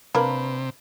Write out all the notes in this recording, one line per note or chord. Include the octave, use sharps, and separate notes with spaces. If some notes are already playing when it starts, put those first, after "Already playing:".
C3 A#3 D4 A#4 B4